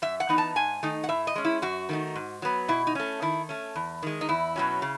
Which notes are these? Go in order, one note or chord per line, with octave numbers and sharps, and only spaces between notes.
F#2 E5
F#5
E3 B3 D#4
A5
G#2 G#5
D#3 A3 D#4
F#5
A2 E5
D#5
G#3 C#4
E4
F#2 F#4
D#3 A3 D#4
G#2
F#3 B3
B2 E4
D#4
A3 C#4
D#3 E4
A3 C#4
E2
D#3 G#3
D#4
E2 E4
B2 F#3 C#4
C#3